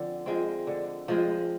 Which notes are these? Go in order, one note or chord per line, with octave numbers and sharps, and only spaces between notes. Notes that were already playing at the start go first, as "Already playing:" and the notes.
Already playing: D3 F3 C4
F3 G#3 C4
D3
F3 G#3 C4